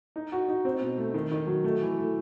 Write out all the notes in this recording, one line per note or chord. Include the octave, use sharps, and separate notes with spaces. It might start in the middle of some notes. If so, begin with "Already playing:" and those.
D#4
F#4
D#4
C4
B2
A3
D#3
D#3
F#3
A3
E3
A3